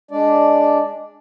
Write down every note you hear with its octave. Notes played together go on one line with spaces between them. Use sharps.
G#3 D4 D5